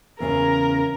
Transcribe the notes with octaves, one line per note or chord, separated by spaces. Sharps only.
E2 C#3 C#4 A#4